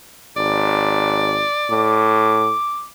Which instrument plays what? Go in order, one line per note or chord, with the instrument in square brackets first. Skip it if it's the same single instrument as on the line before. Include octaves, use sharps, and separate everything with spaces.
[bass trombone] G#1 [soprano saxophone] D5
[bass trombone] A2 [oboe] D6